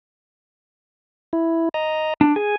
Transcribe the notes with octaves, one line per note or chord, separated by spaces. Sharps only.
E4
D#5 A#5
D4
G#4 G#5